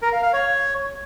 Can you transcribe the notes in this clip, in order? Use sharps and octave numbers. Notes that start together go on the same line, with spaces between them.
A#4
F5
F5
C#5